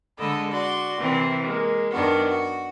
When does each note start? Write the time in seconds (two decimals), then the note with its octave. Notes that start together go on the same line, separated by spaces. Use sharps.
0.19 D3 G#3 A4 D#5 B5
0.50 F#4 D5 C6
0.99 C3 E3 C4 A#4
1.43 G#3 A#3
1.92 F#2 D#3 B3 D4 F#4
2.28 F#4